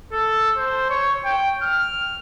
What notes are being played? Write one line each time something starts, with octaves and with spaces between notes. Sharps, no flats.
A4
C5
C#5
G5
F6